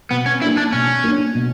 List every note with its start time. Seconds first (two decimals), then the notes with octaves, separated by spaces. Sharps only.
0.10 B2 B3
0.26 C#4
0.42 A#3 D4 E4
0.57 D4
0.73 B2 C#4
1.04 A#3 D4
1.35 B2